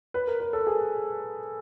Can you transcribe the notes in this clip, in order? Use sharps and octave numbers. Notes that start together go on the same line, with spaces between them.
B4
A#4
B4
A4
G#4